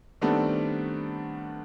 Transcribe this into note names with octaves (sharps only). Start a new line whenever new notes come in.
D#3 G3 A3 B3 C4 D4